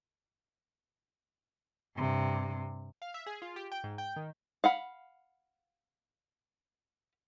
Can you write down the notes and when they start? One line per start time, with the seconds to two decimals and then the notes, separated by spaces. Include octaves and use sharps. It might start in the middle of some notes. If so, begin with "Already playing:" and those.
1.96 G2 C3
3.02 F5
3.14 E5
3.26 G#4
3.42 F4
3.56 G4
3.72 G5
3.84 G#2
3.98 G5
4.16 D#3
4.64 F5 F#5 B5